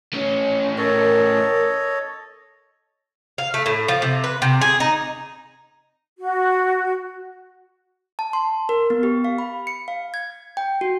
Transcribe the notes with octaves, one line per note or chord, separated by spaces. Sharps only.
A2 C#4
A4 A#4 C#5 D#5
F5
A3
A2
F3
C3
B4
C3
G#4
D#4
F#4
A5
C6
A#4
B3
G4
F5
B5
C#7
F5
G#6
G5
F#4